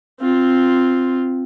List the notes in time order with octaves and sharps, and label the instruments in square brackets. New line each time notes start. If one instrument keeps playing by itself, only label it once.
[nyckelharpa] C4 F4